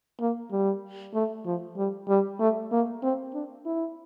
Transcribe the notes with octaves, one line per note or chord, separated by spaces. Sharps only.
A#3
G3
A3
F3
G3
G3
A3
A#3
C4
D4
E4